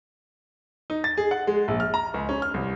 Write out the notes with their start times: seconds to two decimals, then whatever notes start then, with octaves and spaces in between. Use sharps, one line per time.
0.90 D#4
1.04 A6
1.17 G#4
1.31 F#5
1.47 G#3
1.68 A#1
1.80 F6
1.94 A#5
2.14 C#2
2.29 C#4
2.42 F6
2.54 C2